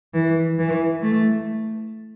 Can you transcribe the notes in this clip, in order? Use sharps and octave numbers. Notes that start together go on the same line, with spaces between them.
E3
E3
A3